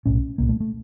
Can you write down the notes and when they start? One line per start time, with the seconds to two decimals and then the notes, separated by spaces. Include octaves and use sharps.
0.06 B1 A2 C#4
0.38 C2 A#2 A#3
0.49 A3
0.60 A3